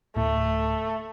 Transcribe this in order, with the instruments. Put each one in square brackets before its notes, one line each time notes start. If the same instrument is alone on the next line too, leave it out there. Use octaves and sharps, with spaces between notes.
[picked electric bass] D1 A2 [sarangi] A3